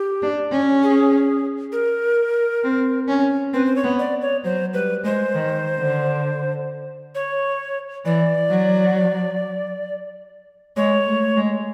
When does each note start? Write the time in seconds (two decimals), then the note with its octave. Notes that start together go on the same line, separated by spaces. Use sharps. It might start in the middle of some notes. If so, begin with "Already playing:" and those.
Already playing: G4
0.22 D4
0.52 C#4
0.83 G#4
1.72 A#4
2.64 C4
3.08 C#4
3.54 C4 B4
3.65 C5
3.76 C#5
3.84 B3
3.99 D5
4.21 C#5
4.44 F#3 C5
4.74 G3 B4
5.04 G#3 C5
5.35 D#3
5.79 D3
7.15 C#5
8.05 E3 D5
8.50 F#3
10.77 G#3 C#5
11.07 A3
11.37 G#3